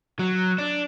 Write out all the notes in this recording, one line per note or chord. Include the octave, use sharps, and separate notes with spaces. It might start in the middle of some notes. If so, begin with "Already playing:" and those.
F#3
D4